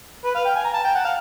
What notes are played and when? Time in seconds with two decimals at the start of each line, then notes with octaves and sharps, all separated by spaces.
0.24 B4
0.35 F5
0.45 G5
0.55 G#5
0.64 A#5
0.74 A5
0.84 G5
0.95 F#5
1.05 F5